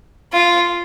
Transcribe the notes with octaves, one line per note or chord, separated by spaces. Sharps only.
F4